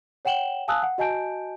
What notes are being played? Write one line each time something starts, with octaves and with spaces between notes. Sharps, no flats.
C#5 F#5 G5 E7 F#7 G7
F5 G#5 A5 D#6 E6 F#6
F#5
F#4 D#5 G#5 A5 G6 D7